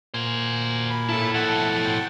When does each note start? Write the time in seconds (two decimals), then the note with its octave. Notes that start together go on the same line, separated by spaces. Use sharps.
0.14 A#2 F#4 C5 G#5
0.91 B5
1.09 E4 A4 A5
1.34 B2 F3 E5 F#5 A5
1.85 G5